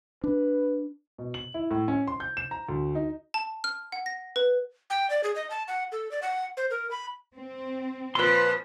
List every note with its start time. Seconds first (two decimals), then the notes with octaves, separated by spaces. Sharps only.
0.24 D4 B4
1.18 B2
1.34 F#7
1.54 E4
1.71 A2
1.88 C#4
2.07 C6
2.20 G6
2.37 E7
2.51 A#5
2.69 D2
2.95 D#4
3.34 A5
3.64 F6
3.92 F#5
4.06 A#6
4.36 B4
4.90 G5
5.10 D5
5.24 G#4
5.35 D#5
5.50 A5
5.68 F#5
5.92 A4
6.11 D5
6.22 F#5
6.57 C5
6.70 A#4
6.91 B5
7.36 C4
8.15 A#2 F3 B4 C6